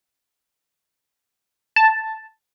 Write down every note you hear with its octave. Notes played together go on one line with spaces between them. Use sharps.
A5